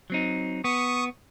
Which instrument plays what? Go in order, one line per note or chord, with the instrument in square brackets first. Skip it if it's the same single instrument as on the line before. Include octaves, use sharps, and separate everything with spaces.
[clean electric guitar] F#3 C4 D#4
[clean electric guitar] B3 [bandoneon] C#6 D#6